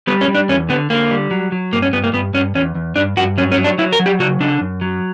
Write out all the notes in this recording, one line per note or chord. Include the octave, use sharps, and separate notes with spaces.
G3 B3
C#4
G3
D4
E2 C#4
D3 B3
D3 A#3
G3
F#3
F#3
G2 A#3
C#4
G2 B3
A#3
G2 B3
G2 C#4
E2 C#4
E2
G2 D4
G2 F#4
F#3 C#4
C#4
F#3
D4
F#3 E4
A#4
F#3
G4
C#3 F#4
C#3 D4
F#2
F#3